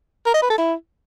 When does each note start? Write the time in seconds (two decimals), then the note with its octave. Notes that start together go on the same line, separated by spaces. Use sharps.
0.26 A#4
0.34 D#5
0.42 B4
0.50 A4
0.58 E4